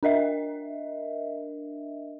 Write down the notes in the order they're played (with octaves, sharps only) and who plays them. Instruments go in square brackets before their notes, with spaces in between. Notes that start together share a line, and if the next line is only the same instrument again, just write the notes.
[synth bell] D4 A#4 D#5 E5